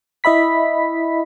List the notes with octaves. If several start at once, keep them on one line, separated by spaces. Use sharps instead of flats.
E4 D#5 E5 B5 B6